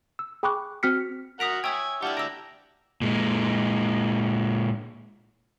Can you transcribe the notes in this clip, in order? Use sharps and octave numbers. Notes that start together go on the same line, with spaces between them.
E6
G#4 G5 B5 C#6 D6 F#6
C4 F#4 F6 B6 C#7
F#4 A#4 F#5 A#5 D#6 B6 D7
C#5 E5 G5 G#5 D#6 G#6
G3 D4 E4 F4 G4 F#5 F#7
D2 A#5 E6 D7
A#2 G#3